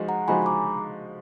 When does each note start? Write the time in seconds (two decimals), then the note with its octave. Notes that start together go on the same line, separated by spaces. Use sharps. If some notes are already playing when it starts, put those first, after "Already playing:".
Already playing: F3 G#3 D#4 F#4
0.08 F#5 A#5
0.28 F3 G#3 D#4 F#4 G#5 B5
0.42 B5
0.46 A#5 D6